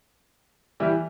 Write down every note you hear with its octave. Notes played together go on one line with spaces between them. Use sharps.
E3 G3